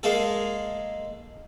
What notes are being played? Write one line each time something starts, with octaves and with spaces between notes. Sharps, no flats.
G#3 A#3 G#4 A4